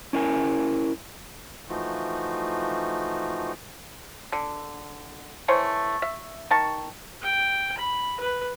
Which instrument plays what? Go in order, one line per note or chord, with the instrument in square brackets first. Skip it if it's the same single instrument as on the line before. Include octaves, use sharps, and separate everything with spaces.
[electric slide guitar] C#4 E4 A#4 G#5
[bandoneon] E3 F3 A3 D#4 F4 F#4
[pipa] D3
E3 A3 C5 C#5
E5
D#3 A5 C#6
[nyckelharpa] G5
B5
B4